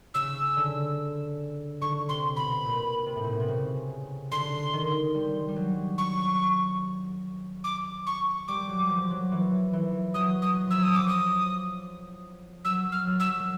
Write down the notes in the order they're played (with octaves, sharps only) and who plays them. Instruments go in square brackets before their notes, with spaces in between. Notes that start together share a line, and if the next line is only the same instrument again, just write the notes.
[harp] C#3 [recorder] E6
[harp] D3
[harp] D3 [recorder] C#6
[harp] C3 [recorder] C6
[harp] B2 [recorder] B5
[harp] A#2
C3
A2
A#2
B2
C3
C#3
[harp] D3 [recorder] C6
[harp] D#3
G3
G3
F#3
[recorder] C#6
D6
C#6
[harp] G3 [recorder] D6
[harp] F#3
F3
F#3
E3
E3
[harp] F#3 [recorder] D#6
[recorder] D#6
[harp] F#3
[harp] F3 [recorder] E6
[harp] F#3
[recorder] D#6
[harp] F3 [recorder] D6
[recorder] D#6
[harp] F#3 [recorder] E6
[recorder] F6
[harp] F#3
[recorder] E6
[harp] F#3